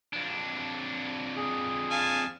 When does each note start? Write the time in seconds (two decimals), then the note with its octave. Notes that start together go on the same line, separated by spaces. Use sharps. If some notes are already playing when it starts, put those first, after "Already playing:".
0.13 F2 D4
1.36 G#4
1.91 F5 G#5 A5